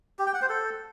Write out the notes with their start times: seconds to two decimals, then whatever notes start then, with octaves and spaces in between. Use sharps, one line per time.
0.19 G4
0.26 G5
0.34 F#5
0.42 C5
0.49 A4